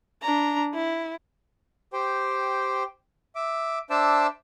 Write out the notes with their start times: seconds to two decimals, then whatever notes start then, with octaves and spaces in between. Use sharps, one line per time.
0.22 D4 A#5
0.74 E4
1.93 G4 C5 G5
3.35 E5 D6
3.90 D4 C5 E5 A5 D6 E6